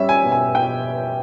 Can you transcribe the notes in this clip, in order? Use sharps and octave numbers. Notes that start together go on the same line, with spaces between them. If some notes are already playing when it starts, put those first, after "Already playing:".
Already playing: G3 C#4 E5
G#5
B2
G#5
B2 G5